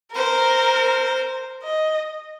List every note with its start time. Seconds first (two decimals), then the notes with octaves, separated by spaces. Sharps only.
0.15 A#4 C5
1.63 D#5